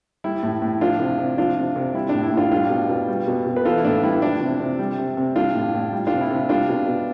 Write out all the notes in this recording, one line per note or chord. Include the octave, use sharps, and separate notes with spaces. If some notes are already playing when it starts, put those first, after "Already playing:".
G3 E4
A2
A2
F3 D4 F4
C3
C3
F3 D4 F4
C3
C3
G3 E4
A2 D4
E4
A2 D4 F4
G3 D4 F4
B2
B2
G3
B2
B2
B4
E3 F4 A4
E4
A2 D4
G3 E4
F3 D4
C3
C3
G3
C3
C3
G3 D4 F4
A2
A2
G3
D4 F4
C3
E4
C3
G3 D4 F4
B2
B2